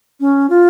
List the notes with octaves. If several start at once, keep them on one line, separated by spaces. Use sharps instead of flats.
C#4
F4